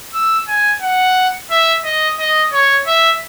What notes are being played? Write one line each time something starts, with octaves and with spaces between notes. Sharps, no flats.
E6
G#5
F#5
E5
D#5
D#5
C#5
E5